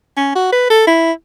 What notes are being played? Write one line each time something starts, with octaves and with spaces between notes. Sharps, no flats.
C#4
F#4
B4
A4
E4